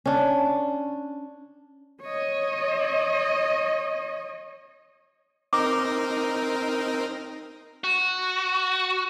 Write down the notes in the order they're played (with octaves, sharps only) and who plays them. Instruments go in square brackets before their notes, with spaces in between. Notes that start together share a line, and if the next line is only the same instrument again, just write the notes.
[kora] C#4 D4
[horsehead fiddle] C#5 D#5
[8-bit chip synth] C4 D#4 A#4 [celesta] D6
[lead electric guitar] F#4